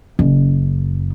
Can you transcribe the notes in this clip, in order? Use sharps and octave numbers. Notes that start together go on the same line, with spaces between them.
F#1